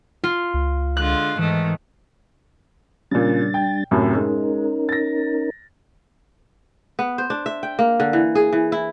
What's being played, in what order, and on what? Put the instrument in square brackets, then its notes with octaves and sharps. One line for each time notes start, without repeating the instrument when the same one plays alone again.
[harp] F4
[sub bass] C#2
[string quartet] D3 G#3 F4 [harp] F#6
[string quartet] G#2 D#3 A3 [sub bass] E3
[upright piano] A#2 C#3 [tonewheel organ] G3 D4 A6
[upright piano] G5
F#2 A2 C3
[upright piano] G#3 [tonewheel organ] C#4 D#4 A#4
[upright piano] A6 A#6
[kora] B3
C5
D4
E5
G5
A#3
D3
E3
G#4
E3
E4